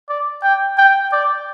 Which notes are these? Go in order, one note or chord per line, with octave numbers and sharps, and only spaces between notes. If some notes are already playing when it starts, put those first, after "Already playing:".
D5
G5
G5
D5